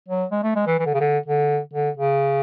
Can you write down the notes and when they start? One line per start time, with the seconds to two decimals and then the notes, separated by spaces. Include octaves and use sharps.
0.08 F#3
0.32 G#3
0.43 A3
0.55 G#3
0.67 E3
0.79 E3
0.86 D3
0.94 C#3
1.00 D3
1.26 D3
1.73 D3
1.97 C#3